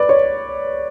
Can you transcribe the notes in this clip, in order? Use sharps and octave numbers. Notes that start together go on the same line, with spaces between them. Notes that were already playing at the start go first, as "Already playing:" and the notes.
Already playing: B4 D5
C#5